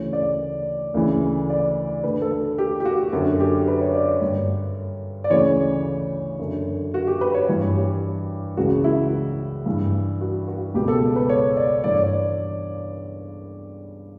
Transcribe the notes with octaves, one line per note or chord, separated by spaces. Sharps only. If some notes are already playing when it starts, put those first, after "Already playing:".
Already playing: D2 C#3 E3 C#5
D5
D2 C#3 E3
D5
D2 D3 B4
A4
A4
G4
G4
F#4
F#2 D3 F#4
G4
B4
C#5
D5
C#5
G2 D3
D5
D2 C#3 E3 C#5
F#2 D3
F#4
G4
B4
C#5
G2 E3 C#5
G4
C#2 C#3 E3 F#4
E4
G2 E3
F#4
F#4
C#2 B2 G4
A4
B4
C#5
D5
G2 E3 D5
C#5
D5